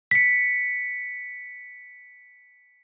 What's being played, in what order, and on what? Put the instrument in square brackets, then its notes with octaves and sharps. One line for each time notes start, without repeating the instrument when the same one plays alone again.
[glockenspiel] B6 C#7